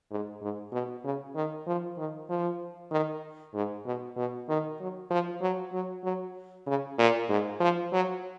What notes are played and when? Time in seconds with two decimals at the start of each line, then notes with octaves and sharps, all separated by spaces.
0.11 G#2
0.41 G#2
0.72 B2
1.04 C#3
1.35 D#3
1.67 F3
1.98 D#3
2.29 F3
2.91 D#3
3.54 G#2
3.86 B2
4.17 B2
4.49 D#3
4.80 F#3
5.10 F3
5.41 F#3
5.73 F#3
6.04 F#3
6.67 C#3
6.99 A#2
7.29 G#2
7.60 F3
7.92 F#3